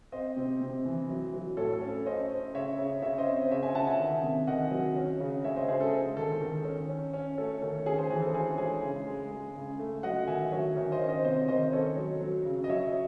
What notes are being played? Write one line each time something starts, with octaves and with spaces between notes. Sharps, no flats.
C4 C5 D#5
C3
C3
E3
F#3
F#3
A2 A4 C#5
A4
C#4
C#4 C5 D#5
C#4
C#3 C#5 E5
C#3
C#3 C#5 E5
C5 D#5
C4
C#3 C#5 E5
E5 G#5
C#3 F#5 A5
E5 G#5
D#3
C3
D#3 D#5 F#5
F#3
C#4
C#3
G#3 C#5 E5
C5 D#5
C#3 G#4 C5
A4
G#3
D#3 A4
D#3
C#4
C#4
C#4
A3 A4 C#5
D#3 A4
C#4 G#4
G#4 C5
E3 G#4
A4
C#4 G#4 C5
G#3 G#4
C#3
G#3
G#3
C#3
A3
F#3 D#5 F#5
D#3 E5 G#5
F#3 C#5 E5
D#3
C5 D#5
C#4
C5 D#5
C3 C5 D#5
D#3 C5 D#5
C#4 A4 C#5
F#3
F#3
C#3
D#5
F#3 C#5 E5